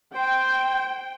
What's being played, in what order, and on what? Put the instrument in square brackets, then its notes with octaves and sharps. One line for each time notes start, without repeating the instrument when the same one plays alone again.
[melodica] C5 [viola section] G5